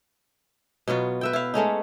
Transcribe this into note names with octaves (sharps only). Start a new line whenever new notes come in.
B2 F#3 B3 F4
B4 E5 G5
E4 F5
G#3 A3 C#4 D#4